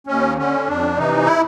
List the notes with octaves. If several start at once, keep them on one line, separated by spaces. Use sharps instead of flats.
D#2 C#4
D3 C#4
F2 D4
C3 E3 D#4
E4